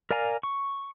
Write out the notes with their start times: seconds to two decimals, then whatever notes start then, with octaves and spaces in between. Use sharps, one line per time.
0.11 A#4 D5 F5 G#5 A#5
0.43 C#6